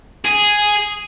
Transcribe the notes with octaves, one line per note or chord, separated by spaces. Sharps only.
G#4